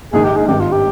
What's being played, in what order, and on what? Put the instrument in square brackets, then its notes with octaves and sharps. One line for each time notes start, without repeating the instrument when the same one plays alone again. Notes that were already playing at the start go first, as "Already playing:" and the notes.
[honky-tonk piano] A#1 G#2 D#3 [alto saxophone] G#4
[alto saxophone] G4
G#4
[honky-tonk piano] G#1 G2 G3 [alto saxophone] G4
[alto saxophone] F4
G4